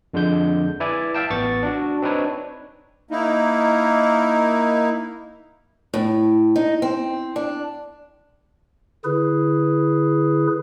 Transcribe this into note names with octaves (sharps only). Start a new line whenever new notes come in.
F2 D3 G#3 G6
E4 B4 D5 E5 G#5
E5 F5 G5 A5
A1 B3 C#6 A6
D4 F#4
C4 D4 D#4 B4 C#5
A#3 D#4 E4
A2
D#4
C4
D4
D3 E4 G#4 B4